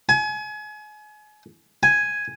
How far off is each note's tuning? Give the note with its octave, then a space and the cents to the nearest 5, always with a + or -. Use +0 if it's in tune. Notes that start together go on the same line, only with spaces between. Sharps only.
G#5 +35
G#5 +5